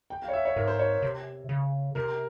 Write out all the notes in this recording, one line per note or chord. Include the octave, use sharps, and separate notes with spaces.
G5
F5
C#5
E5
C#5
G#2 A#4
C5
C#5
C3
C#3
C3 A#4